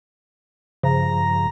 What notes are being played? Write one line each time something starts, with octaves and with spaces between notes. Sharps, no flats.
G2 C#3 F3 A#5